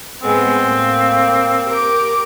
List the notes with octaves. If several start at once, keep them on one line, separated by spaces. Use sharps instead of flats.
A2 G#3 B3 C4
A2 A#3
G4 A#4 D6